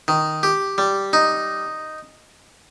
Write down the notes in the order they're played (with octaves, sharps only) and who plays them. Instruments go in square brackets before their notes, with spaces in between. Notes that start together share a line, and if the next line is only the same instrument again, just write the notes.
[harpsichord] D#3
G4
G3
D#4